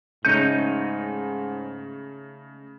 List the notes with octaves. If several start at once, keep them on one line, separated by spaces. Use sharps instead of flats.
G#2 C#3 A3 C#4 D#4 G6 C#7 D#7